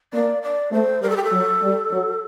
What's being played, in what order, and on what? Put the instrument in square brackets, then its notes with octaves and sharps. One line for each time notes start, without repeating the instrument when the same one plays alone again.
[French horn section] A#3 [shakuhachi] D5
[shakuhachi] D5
[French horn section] A3 [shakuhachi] C5
[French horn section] G3 [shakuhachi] A#4
[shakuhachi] A4
G4
A4
[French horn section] F#3
G3
F#3